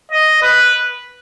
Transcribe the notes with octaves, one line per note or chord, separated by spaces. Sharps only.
D#5
B4